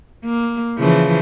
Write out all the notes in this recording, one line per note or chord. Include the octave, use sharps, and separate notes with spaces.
A#3
C#3 E3 F3